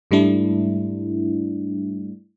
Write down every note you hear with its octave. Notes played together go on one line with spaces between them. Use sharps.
G#2 G3 A3 D4 E4